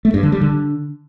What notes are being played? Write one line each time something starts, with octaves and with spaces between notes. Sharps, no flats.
A3
G2
D3
G3
D3